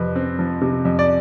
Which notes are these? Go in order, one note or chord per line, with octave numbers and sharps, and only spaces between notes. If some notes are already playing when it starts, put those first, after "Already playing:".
Already playing: F2 C3 B4
C4
F3
C3
F2
D5